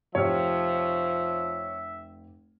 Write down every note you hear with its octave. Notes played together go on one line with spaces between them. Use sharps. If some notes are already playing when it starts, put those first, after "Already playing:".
F1 F3 G4 C#5 E5 F6